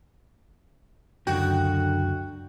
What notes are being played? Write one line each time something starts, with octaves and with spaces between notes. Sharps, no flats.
C#2 F#2 D3 F#4 G5